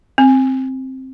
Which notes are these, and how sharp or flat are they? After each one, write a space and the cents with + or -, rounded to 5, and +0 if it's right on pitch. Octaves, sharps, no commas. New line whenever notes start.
C4 +5